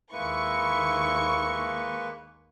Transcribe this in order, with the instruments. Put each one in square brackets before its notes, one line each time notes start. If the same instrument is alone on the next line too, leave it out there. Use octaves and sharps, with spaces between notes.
[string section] D#2 C#6 [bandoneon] G#3 A#3 B4 [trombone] E4